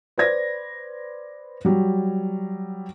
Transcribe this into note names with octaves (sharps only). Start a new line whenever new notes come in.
B4 C5 D5 G#6 A#6
F#3 G3